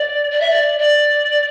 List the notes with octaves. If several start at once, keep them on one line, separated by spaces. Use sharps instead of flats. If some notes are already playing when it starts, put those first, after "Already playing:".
Already playing: D5
D5
E5
D5
D5